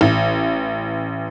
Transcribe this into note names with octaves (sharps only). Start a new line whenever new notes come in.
A1